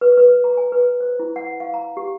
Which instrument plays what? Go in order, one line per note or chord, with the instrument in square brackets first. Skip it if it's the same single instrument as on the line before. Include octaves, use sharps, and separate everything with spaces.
[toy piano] B4
B4
A#5
G#5
B4
C5
E4
F#5
F5
A#5
G4